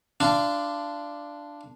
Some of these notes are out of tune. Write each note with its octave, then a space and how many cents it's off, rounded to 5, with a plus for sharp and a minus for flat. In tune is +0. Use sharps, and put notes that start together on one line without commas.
D4 +0 F4 -25